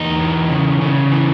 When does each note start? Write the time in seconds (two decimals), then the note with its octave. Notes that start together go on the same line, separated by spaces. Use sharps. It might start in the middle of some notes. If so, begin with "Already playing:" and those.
Already playing: E2 D#4
0.19 E3
0.50 C#3
0.81 C#3
1.11 E3